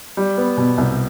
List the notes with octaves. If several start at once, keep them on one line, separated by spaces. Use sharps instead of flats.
G3
B3
B2
C2